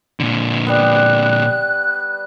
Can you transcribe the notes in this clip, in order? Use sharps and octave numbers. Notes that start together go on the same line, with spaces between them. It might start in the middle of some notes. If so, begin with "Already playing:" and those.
A#2 D3
G3 B3 F#6